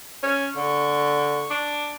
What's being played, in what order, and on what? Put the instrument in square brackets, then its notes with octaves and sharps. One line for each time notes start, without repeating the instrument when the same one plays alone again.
[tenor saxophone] C#4
[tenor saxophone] D3 [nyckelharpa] C#6
[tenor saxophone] D4